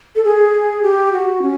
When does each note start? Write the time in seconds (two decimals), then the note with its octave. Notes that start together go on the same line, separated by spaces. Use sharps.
0.16 A4
0.25 G#4
0.83 G4
1.13 F#4
1.42 C#4